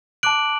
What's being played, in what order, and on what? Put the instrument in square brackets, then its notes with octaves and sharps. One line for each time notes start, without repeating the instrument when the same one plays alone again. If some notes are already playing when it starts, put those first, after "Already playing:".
[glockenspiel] A5 D6 F#6 D7 F#7